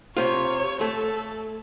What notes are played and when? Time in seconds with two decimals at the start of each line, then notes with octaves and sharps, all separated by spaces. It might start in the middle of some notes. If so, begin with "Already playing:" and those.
0.17 C3 F4 C#5
0.81 A3 A4